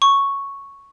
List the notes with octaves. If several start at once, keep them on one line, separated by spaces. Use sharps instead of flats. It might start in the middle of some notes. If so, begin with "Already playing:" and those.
C#6